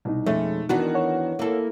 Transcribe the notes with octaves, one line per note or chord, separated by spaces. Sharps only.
C2 B2 D#4
F2 G#3 A3 C#4
E2 D#3 E3 B3 D4 F#4
C#5 F#5
A#3 E4 A4